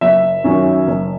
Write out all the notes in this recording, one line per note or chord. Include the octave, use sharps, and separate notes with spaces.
F#1 E5
F#2 D#3 F#3 C#4
F#1